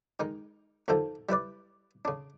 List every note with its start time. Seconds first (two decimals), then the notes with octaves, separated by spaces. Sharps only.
0.20 D#3 G#3 D#4
0.88 D#2 D3 D#3 F3 A4
1.29 G3 E4 B4 D5
2.05 C#3 D4